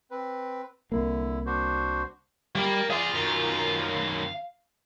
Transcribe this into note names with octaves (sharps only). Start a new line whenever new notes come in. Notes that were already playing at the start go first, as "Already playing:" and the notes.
C4 B4
C2 D3 A#3 E4
D4 F#4 C5
G3 A#3
G#4 D5 F5 C6
F#2 D#3